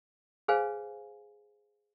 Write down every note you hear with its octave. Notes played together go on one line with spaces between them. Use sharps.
G#4 B4 C5 F5 G#5